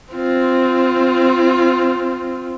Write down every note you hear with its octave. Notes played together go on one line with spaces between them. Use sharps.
C4 F4